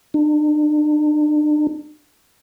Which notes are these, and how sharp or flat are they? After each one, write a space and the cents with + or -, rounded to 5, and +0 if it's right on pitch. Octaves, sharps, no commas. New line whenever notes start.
D4 +40